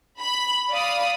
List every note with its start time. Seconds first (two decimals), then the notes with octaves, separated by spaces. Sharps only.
0.19 B5
0.71 D5 F5 B5 D#6